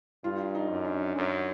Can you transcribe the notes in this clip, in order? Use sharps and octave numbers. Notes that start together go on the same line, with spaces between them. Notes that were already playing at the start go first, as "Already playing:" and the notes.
G2 F4
D#4
F#2
D4
F#2 C#4